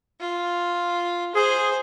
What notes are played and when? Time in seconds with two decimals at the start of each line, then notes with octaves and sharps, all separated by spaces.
0.20 F4
1.35 G#4 C5